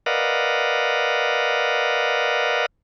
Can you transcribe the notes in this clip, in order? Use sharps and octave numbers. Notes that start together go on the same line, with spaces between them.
A#4 B4 D5 D#5 F5 F#5